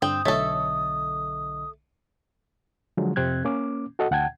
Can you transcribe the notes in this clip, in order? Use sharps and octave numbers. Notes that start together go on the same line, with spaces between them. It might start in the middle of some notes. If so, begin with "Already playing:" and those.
G2 D3 C4 G5 D#6
B1 D3 A3 A4 C#5 D#5 E5
D3 F3 F#3 G#3
F2 C3 C4 F#6 G#6
A#3 C#4 D6
F#4 A4 D#5 F#5
D2 F#5 G5 A5 G#6